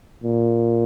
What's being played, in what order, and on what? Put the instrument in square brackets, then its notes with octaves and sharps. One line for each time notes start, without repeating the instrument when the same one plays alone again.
[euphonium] A#2